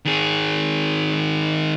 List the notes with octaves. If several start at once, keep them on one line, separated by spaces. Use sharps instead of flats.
D#3 G#4